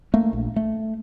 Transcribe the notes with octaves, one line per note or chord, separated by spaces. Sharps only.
A3 A#3
A#1
A3